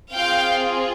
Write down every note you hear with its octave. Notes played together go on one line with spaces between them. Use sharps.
C4 F4 G#4 F5 G5